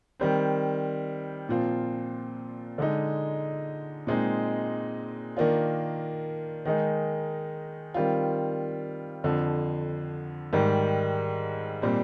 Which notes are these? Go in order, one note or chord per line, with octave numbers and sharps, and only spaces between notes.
D#3 G3 C4
A#2 F3 C4 F4
D3 G#3 D#4
A#2 G#3 C4 D#4
D#3 A#3 D4 F4
D#3 G#3 D#4
D#3 G3 C4 F4
F2 D3 F3
G#2 D#3 G3
A#2 G3 C4